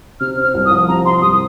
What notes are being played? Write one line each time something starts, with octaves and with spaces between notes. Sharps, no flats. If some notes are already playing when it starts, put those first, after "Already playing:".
C3 F6
C4
F6
C2
D#6
F3
C3 A#5
C4 C6
C2 D#6